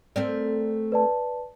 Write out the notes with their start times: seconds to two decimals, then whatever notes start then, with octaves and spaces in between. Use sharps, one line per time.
0.16 A3 C4 A#4 D5
0.92 B4 D5 A5